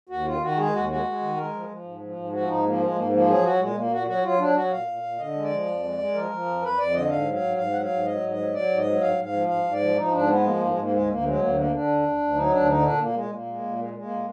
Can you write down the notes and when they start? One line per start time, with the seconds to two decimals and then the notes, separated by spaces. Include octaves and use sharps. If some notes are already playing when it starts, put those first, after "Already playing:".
0.09 D#2 F#4
0.25 D#3 F4
0.42 D#3 F#4
0.57 G#3 G#4
0.73 D#2 F#4
0.89 G#3 F#4
1.05 G#3
1.21 D#3
1.37 G#3 A#4
1.53 F3
1.68 F3
1.84 G#2
2.01 F3
2.16 G#2
2.32 F3 F#4
2.48 G#2 D#4
2.64 F3 A#3
2.80 G#3
2.96 G#2 A#3
3.12 F3 A#3
3.28 F#3 G#4
3.44 F#3 F#4
3.59 A#2 G#3
3.75 A#2 A#3
3.92 A#2 F#4
4.07 F#3 F#4
4.23 F#3 F4
4.39 F#3 D4
4.55 F#3 F#4
4.71 A#2 F5
4.87 A#2
5.03 A#2
5.18 D3 D#5
5.35 G#3
5.42 D5
5.50 F3
5.66 F2
5.82 G#3
5.98 G#3
6.14 F3 A#4
6.30 F3
6.46 F2
6.62 F2 B4
6.77 F2 D5
6.93 D3 D#5
7.09 G#2 F5
7.25 F#3
7.34 F5
7.42 G#2
7.57 G#2 F5
7.73 F#3 F#5
7.81 F5
7.89 G#2
8.05 F#3 D#5
8.20 G#2
8.29 D#5
8.36 F#3
8.52 F#3 D5
8.69 G#2
8.77 D#5
8.84 F#3
9.01 G#2 F5
9.16 G#2
9.24 F5
9.32 F3
9.48 G#2 F5
9.64 G#2
9.72 D5
9.80 F3
9.96 F3 D#4
10.12 G#2 D4
10.28 G#3 B3
10.44 F3 A#3
10.56 G#2 A#3
10.68 G#3
10.75 G#2 A#3
10.91 D2 G#3
11.07 D2 A#3
11.24 F#3 G#3
11.39 D2 A#3
11.55 D3 A#3
11.71 D3 D4
11.87 D2
12.03 D2
12.19 D2
12.34 F#3 D#4
12.50 D2 D4
12.66 D3 D#4
12.82 A#2 D4
12.99 A#2 A#3
13.14 A#2 G#3
13.30 A#2 A#3
13.46 G#3
13.62 A#2
13.78 G#3
13.93 G#3
14.02 A#3
14.10 A#2